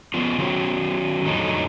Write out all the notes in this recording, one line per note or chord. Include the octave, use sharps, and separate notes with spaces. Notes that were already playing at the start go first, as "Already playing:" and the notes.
F3 B3 F4
D#3 F#3 C#4 F#4
F2 A2 D3 D#3 F#3 D#4